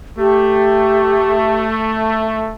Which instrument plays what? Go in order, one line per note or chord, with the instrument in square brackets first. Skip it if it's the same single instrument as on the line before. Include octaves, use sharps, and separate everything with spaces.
[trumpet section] A3 [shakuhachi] G4